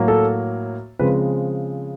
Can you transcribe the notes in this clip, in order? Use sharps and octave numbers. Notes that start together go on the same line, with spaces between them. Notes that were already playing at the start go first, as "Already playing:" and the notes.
Already playing: A2 F#3 A#3
A4
C#3 F3 G#3 C4 B4